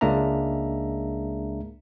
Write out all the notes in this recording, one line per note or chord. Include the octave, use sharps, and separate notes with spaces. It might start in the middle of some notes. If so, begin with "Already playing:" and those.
C#2 G#3 A#3 D4 E5 A#5